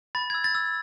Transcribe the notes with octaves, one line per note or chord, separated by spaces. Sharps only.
B5 A6
G#6
E6
A6
E6